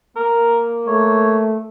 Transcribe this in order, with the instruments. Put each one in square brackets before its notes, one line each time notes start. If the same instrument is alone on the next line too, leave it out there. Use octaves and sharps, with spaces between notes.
[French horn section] A#3 [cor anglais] A#4
[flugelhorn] A3 [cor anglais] C#5